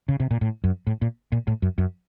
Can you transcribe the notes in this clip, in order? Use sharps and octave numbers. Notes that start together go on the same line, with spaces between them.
C#3
C3
A#2
A2
F#2
A2
A#2
A#2
A2
F#2
F#2